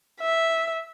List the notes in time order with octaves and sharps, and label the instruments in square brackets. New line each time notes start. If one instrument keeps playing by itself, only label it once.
[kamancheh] E5